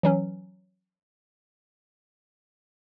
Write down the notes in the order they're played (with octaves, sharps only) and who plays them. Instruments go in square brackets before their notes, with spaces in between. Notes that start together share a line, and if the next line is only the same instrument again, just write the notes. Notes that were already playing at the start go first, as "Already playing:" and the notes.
[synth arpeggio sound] E3 F#3 C#4